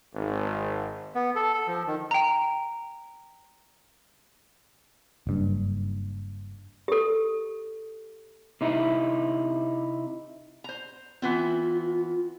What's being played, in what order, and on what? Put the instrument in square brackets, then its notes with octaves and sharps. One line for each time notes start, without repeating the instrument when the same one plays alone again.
[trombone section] G#1
[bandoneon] B3
A4
A4
F3
D#3
[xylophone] G5 A#5
[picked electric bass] F#1 G2
[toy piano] G4 A4
[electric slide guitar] C3 D#4 E4
[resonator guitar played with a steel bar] C5 A#5
[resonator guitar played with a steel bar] E3 B3 C4 [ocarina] F4